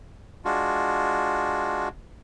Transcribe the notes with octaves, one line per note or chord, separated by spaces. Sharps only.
G#3 D4 F4 F#4